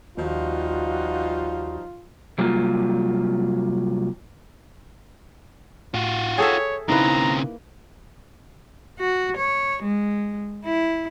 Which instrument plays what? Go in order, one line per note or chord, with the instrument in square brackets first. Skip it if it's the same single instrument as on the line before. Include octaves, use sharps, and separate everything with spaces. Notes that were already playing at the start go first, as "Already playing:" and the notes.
[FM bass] D#2 [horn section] F3 G3 D#4 [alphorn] F4 [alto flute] F#4
[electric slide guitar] C3 F#3 G3 A#3 F4
[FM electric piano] A2 [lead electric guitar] F4 F#4
[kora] G#4 A4 E5 [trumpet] C#5 [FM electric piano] G5
[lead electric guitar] C#3 C4 [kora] A#3 B4 [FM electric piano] D#4 E4 [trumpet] A#5
[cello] F#4
C#5
G#3
E4